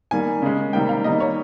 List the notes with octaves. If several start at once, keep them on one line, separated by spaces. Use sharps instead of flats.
D#3 G3 A#3 G#5
C#3 G#3
C3 D#3 G3 A#3 G5
F5
D#3 G3 A#3 D#5
C#5